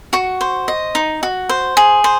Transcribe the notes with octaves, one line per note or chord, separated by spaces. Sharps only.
F#4 C#6
C5
D#5
D#4
F#4
C5
G#4
C5